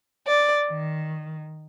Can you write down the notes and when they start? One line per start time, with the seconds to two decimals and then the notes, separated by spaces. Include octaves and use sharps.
0.28 D5
0.69 D#3